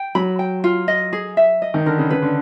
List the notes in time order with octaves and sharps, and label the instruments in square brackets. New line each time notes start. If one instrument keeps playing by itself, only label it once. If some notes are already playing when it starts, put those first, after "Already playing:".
Already playing: [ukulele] G5
[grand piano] F#3 [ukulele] B5
[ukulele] G5
F4
D#5
G#4
E5
D#5
[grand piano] D#3
[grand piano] D3 [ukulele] A#4
[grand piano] C#3
[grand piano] C#3 [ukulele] B4
[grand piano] D3